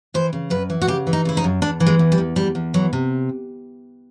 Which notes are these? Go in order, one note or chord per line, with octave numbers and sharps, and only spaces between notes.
E3 C5
C#3
F#2 B4
E3
F#4
C#3 G4
E3
D#4
C#3 E4
D#4
F#2
E2 D4
E3
G#3
E2
G3
E2
E2 G3
E2
E3 F#3
C3